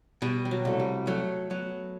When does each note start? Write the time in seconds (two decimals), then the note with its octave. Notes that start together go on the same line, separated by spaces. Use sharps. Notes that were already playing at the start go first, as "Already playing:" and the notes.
0.22 B2 G3
0.45 G3
0.51 F#3
0.65 C2 A3
0.80 G3
1.07 F#3 A3
1.50 F#3 B3